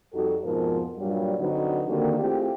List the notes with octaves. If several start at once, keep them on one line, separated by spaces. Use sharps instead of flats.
F2 G3 D#4 F#4 A4
F2 G#2 B2 F3 A#4 C5
G2 A#2 F#3 G3
D3 F#3 C4 D#4 F#4 B4
D3 D#3 A#3 C4 F#4 G4
A3 C4 E4 F4 G4 G#4